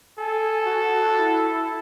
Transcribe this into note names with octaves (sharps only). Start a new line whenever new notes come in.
A4 G#5
F#4
E4